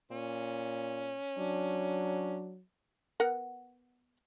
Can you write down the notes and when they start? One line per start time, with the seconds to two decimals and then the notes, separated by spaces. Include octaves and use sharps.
0.11 A#2 C#4
1.38 F#3 D4
3.20 B3 A#4 F#5